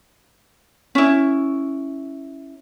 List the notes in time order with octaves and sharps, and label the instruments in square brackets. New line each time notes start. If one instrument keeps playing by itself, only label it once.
[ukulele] C#4 E4